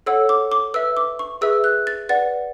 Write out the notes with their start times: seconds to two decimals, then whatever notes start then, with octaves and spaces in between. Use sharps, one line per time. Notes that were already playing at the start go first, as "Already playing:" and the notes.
0.06 A4 C#5 F#5 E6
0.29 D6
0.52 D6
0.74 B4 E5 E6
0.97 D6
1.19 C#6
1.41 G#4 B4 E5 E6
1.64 F#6
1.87 A6
2.09 B4 D5 F#5 A6